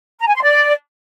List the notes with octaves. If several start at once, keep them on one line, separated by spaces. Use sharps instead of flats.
A#5
G#5
C6
D5